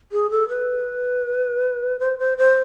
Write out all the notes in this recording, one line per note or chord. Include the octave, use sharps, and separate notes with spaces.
G#4
A4
B4
C5
C5
C5